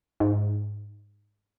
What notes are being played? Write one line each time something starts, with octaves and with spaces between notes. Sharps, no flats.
G#2